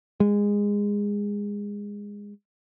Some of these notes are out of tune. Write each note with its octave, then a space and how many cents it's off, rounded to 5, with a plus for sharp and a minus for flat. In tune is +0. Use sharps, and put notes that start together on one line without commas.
G#3 -20